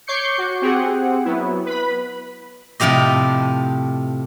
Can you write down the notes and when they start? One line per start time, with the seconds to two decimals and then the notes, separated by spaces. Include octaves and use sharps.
0.07 C#5 C#6 D6 G6 C7 C#7
0.38 F#4
0.62 C4 G4 G#4 F#5
1.25 F#3 B3 E4
1.66 B4 B5
2.80 A2 C3 F3 G4 D#5